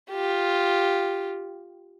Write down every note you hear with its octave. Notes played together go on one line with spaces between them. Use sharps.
F4 G4